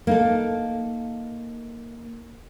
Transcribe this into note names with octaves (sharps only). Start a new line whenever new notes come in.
A#3 D#4 A4